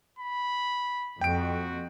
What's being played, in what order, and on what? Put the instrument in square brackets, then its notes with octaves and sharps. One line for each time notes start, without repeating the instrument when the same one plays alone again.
[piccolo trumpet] B5
[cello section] F2 [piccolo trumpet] F#4 [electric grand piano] G5 D7